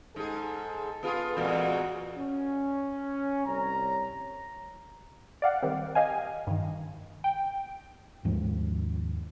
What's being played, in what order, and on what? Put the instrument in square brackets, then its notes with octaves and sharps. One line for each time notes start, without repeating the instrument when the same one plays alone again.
[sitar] G#2 G#4 [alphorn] A4
[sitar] B3 F4 G#4
[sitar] E2 A#2 G#3 [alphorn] F#4
[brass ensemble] C#4
C2 C#5 A#5
[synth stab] D5 F5 F#5
D#3 G3 C4
G4 D#5 F5 G#5
G2 D#3
G5
[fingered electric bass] D#2 G#2 F3